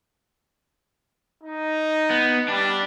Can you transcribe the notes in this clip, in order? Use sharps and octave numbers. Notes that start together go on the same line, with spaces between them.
D#4
B3
G3 D4